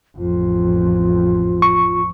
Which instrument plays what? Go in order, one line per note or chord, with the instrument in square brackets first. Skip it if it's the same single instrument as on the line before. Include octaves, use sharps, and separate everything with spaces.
[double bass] A1 F2 [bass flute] F4
[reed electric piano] C#6